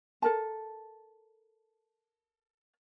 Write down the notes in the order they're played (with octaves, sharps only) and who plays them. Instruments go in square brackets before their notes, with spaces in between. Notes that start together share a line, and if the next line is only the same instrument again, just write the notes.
[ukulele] A4 A#4 A5